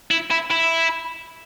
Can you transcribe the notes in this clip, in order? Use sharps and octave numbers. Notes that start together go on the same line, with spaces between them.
E4
E4
E4